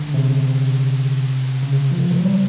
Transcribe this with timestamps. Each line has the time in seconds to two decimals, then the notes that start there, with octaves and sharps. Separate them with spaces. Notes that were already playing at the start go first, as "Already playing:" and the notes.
Already playing: D3
0.14 C3
1.63 C#3
1.91 F3
2.11 F#3
2.21 G3